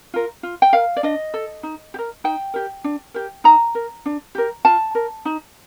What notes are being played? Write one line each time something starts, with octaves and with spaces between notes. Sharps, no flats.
F4 A#4
F4
G5
A#4 F5
D5
D4 D#5
A4
D#4
G4
A#4
D#4 G5
G4 A#4
D4
G4 A#4
D#4 A#5
A#4
D4
G4 A#4
F4 A5
A#4
D#4